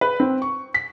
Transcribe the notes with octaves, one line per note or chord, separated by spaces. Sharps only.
B4
C4
C#6
B6